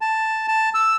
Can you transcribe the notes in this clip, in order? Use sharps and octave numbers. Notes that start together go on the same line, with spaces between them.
A5
A5
E6